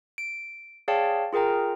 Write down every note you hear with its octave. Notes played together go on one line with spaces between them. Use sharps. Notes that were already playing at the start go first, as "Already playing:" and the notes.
D7
G#4 C#5 D5 F5 G5 A5
F4 G#4 A#4 G5 A#5